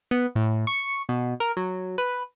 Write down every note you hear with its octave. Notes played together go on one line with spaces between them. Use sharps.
B3
A2
C#6
B2
A#4
F#3
B4